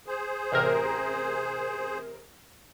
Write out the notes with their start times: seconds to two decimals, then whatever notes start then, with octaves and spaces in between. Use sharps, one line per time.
0.07 G#4 C5
0.52 A1 C3 A#4